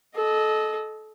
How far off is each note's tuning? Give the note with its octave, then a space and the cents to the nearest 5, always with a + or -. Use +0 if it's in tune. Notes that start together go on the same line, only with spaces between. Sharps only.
A4 -25 D#5 +0